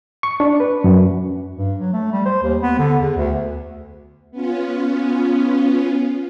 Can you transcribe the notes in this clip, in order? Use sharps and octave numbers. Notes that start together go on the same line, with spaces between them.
C#6
D4
B4
F#2
G2
F#3
A3
G3
C5
D#2
B3
D3
E2
D2
B3 C#4 F4